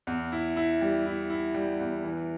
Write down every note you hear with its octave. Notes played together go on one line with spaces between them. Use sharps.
E2
E4
E4
G3
E4
E4
G3
E2
E3